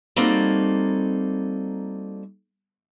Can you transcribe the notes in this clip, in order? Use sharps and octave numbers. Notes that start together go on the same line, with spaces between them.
G3 A#3 C4 D#4 F#4 A4